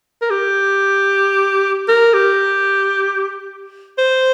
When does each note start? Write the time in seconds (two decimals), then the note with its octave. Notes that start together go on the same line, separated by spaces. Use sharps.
0.22 A#4
0.30 G4
1.88 A#4
2.14 G4
3.98 C5